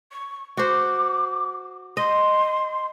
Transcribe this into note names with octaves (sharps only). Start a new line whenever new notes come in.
C#6
F#4 C5 D6
D#5 C6